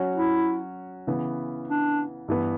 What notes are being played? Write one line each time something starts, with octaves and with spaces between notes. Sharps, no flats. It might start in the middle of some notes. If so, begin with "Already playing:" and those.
Already playing: F#3 C#4 F#4 C#5
E4
C#3 E3 B3
D4
G2 E3 B3